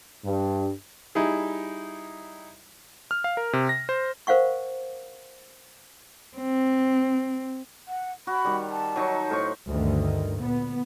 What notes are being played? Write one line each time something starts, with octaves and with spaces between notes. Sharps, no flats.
G2
G3 D#4 E4 G#4
F6
F5
A#4
C3
A#6
C5
A#4 C5 F5 F#5 C#6
C4
F#5
F#4 B5
D#3 G3
A5
F#3 D#4 C#6
A2 C5 C#6
D2 G2 D3 D#3
A#2 B3